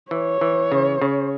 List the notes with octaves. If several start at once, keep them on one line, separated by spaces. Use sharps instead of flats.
E3 C#5
E3
C#3
C#3